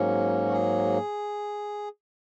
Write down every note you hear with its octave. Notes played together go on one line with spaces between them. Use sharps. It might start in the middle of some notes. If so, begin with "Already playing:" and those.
Already playing: G#2 F#3 A#3 C#4
F#4
G#4